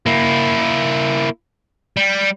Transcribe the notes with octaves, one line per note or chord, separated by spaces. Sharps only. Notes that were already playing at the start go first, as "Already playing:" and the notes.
A#3 E4
G3